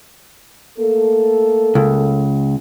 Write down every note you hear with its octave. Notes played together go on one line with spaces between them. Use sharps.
A3 A#3 A4
C#2